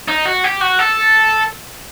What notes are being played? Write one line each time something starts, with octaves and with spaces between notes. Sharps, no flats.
D#4
F#4
G4
F#4
A4